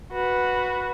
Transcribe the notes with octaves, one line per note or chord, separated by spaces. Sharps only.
F#4 B4